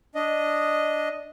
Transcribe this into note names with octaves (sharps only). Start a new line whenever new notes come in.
D4 D#5